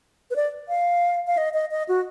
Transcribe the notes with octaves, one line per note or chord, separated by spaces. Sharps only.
B4
D5
F5
F5
D#5
D#5
D#5
F#4